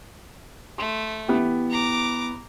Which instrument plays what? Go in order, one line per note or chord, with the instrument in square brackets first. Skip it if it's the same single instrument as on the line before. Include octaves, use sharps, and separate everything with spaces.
[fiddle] A3 [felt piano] C6
[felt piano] E3 B3 G4
[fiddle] A#5 D6